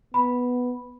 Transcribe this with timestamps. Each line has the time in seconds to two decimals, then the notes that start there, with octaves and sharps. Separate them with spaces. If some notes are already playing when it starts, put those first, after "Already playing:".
0.14 B3 B5